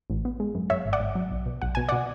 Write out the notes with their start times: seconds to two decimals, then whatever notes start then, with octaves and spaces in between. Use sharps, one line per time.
0.10 A1
0.25 B3
0.40 G#3
0.55 F#2
0.70 F#2 C#5 E5
0.85 G#1
0.93 D5 F#5
1.00 G#1
1.15 F#3
1.31 B1
1.46 B2
1.62 B1 F#5
1.75 B2 G#5
1.89 B2 D5 F#5